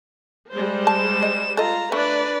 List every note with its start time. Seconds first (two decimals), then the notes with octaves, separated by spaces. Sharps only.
0.50 G3 G#3 C5
0.87 A5 E7
1.23 D#5
1.57 F4 A4 D#5 A#5
1.92 A3 D4 B4 D5